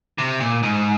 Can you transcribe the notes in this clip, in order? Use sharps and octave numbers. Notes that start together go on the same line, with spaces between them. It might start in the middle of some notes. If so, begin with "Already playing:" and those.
C3
A#2
G#2